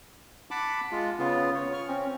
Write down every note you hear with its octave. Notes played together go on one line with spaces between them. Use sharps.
F#5 A5 B5 D6
G#3 F4
C#3 B3 F4
C#5
C#6 F6
C4 C#4